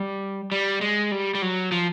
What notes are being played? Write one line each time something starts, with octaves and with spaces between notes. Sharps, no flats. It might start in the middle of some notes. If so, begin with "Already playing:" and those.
Already playing: G3
G3
G#3
G3
G3
F#3
F3